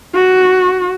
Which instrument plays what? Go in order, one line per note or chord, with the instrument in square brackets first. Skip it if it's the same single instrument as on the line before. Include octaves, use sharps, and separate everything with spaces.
[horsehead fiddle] F#4